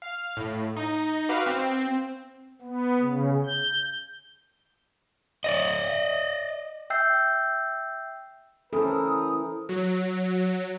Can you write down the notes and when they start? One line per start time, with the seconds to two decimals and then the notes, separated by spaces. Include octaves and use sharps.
0.02 F5
0.37 A2
0.76 D#4
1.29 F#4 B4 F5 D6 F6
1.46 C4
2.62 B3
3.01 C#3
3.46 G6
5.44 D5 D#5
6.90 E5 G5 E6 G6 C7
8.73 E3 C#4 A4 A#4 C5 D#6
9.69 F#3